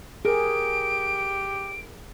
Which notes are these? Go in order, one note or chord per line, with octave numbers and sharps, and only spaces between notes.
G4 G#4 A#4 D7